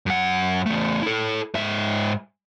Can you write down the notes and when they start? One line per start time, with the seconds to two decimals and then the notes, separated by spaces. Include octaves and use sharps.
0.06 F#2 F#5
0.66 E2 A3
1.02 E4 A4
1.55 G#2 E5